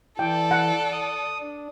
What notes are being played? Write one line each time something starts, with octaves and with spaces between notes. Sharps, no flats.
E3 A4 D5 G5
F#5
D#6
D4